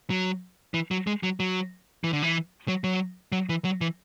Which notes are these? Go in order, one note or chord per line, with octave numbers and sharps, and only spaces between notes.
F#3
E3
F#3
G#3
F#3
F#3
E3
D3
E3
F#3
F#3
F#3
E3
F#3
E3